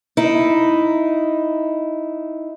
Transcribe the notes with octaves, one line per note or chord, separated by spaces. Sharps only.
D#4 E4